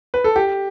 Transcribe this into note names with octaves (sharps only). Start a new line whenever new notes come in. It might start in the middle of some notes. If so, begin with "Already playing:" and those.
B4
A4
G4